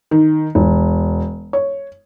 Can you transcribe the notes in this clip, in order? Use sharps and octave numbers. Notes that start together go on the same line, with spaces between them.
D#3
E1
C#5